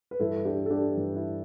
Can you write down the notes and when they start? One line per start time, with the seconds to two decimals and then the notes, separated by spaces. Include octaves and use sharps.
0.11 B4
0.19 G2 E3 E4 A4
0.45 D4 G4
0.66 A4
0.70 D4 G4
0.96 G2 E3
1.16 E4